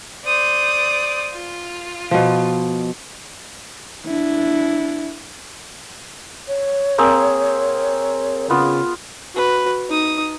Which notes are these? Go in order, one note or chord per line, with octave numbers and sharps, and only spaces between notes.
C5 D5 D#6
F4
B2 F3
D4 E4
C#5
A#3 C4 G#4
C#3 B3 F4
F#4 B4
D#4 D#6